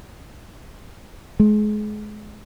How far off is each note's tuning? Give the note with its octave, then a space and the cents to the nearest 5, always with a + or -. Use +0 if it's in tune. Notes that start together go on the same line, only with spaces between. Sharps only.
G#3 +30